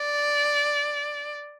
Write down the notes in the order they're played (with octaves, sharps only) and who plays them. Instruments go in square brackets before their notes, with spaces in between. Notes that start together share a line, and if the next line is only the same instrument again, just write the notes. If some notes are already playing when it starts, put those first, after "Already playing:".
Already playing: [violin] D5